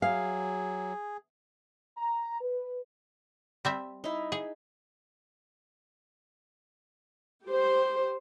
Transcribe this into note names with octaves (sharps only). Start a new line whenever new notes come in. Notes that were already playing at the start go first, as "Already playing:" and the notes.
F#3 G#4 F5
A#5
B4
G3 C4 E5
D#4 E4
G#4
G4 C5